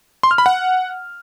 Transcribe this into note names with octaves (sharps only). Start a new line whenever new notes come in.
C6
F6
B5
F#5